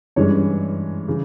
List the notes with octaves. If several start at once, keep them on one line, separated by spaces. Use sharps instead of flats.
G2 E3 G#3 C#4 C#5
C#3 E3